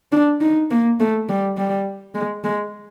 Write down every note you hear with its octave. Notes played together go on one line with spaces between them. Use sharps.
D4
D#4
A#3
A3
G3
G3
G#3
G#3